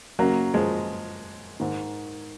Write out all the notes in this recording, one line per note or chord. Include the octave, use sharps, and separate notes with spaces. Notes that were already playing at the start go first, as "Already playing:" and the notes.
F#2 C#3 F#3 A#3
F3 G#3
G#2 D#3